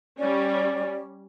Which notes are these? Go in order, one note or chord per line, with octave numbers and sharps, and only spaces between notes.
G3 C#4 D5